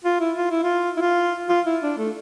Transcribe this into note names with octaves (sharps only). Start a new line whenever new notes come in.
F4
E4
F4
E4
F4
E4
F4
F4
E4
D4
A3